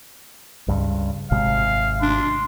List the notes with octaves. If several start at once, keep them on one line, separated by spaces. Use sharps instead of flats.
C#2 G2
G#1 C3 G#3 F5
D4 C6